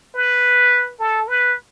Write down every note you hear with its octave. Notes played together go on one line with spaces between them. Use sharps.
B4
A4
B4